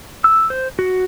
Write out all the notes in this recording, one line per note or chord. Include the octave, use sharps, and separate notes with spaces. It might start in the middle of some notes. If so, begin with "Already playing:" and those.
E6
C5
F#4